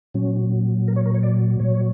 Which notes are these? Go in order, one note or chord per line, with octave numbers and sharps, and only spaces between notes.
A#2 F#3 C#4
A#4
C#5
A#4
C#5
D5
A#2 F#3 C#5